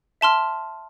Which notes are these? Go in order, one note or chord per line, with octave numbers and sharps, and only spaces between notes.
E5 A5 C6 F6